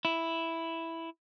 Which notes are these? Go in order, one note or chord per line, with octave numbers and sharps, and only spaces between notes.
E4